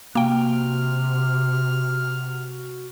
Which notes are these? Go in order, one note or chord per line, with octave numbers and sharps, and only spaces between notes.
C3 A#3 F#4 G5 F6